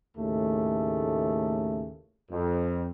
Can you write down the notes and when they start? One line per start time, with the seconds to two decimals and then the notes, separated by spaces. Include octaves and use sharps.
0.17 D#2 A2 C#3 A3
2.30 F2